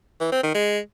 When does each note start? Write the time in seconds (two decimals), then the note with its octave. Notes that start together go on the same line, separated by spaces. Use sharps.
0.21 E3
0.32 C4
0.43 D#3
0.55 G#3